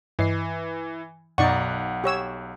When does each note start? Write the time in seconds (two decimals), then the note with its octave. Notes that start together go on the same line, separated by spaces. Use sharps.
0.19 G2 E3 D#5 C7
1.38 B1 F#2 B2 D#4 D5 F#5 C#6
2.04 G4 C#5 E6